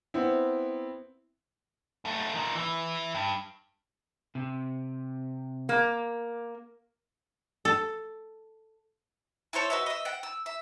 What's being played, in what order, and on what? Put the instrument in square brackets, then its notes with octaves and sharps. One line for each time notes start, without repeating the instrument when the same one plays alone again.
[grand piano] B3 C4 E4
[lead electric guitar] F#2 A3
A#2 D#3
E3 E4
G2
[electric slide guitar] C3
[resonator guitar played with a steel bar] A#3
[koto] A4
[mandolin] E4 A4 C5 C#5
F#4 B4 D#5 E5
D#5 E5
F#5 G5
E6
E5